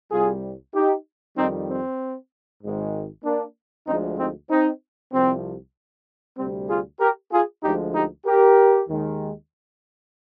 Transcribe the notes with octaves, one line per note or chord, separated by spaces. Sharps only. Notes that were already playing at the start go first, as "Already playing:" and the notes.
C2 C3 G3 F4 G#4
D#4 G4
F2 D#3 G3 C4 D#4
C4
G#1 G#2 D#3 G#3
A#3 D4
D2 D3 F3 G#3 C4 D#4
C4 D#4
C4 D#4
C2 C3 F3 C4
D2 C3 G3 C4
F4 G#4
G4 A#4
F4 G#4
D2 D3 F3 G#3 D#4 G4
D#4 G4
G4 A#4
D#2 D#3 G#3